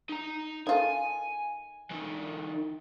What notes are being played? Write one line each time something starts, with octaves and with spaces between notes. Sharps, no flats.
D#4 A#5
D#3 F4 A4 G#5
E3 D#4